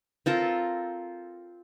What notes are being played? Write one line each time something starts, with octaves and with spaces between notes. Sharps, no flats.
C4 F4 A4 A#4